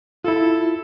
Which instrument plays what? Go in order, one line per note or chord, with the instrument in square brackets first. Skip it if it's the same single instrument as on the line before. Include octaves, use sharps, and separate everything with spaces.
[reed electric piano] E4 F4 [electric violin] A4